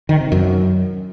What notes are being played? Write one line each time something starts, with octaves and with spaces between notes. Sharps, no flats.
D#3
C3
F#2